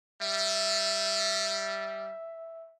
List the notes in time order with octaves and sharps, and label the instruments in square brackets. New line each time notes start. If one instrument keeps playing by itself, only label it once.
[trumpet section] G3 [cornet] E5